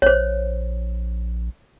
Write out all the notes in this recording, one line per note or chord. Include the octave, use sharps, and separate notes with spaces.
A#1 C5 C#5